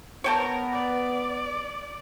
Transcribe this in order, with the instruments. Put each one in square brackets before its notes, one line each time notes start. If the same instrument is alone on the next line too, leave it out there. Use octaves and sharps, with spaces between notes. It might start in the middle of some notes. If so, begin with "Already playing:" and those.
[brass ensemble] B3 [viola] A#4 [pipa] C#5 G5 A5
[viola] D5